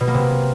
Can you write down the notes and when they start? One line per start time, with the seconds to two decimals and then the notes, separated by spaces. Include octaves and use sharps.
0.01 B2
0.07 A#3
0.14 C3